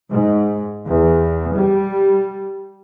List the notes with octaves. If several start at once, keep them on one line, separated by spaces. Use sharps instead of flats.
G#2
E2
G3